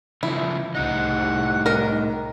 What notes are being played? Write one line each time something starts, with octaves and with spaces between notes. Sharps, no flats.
C#3 E3 F3 E4
C2 A2 D#4 D#5 F#5
D#3 A#4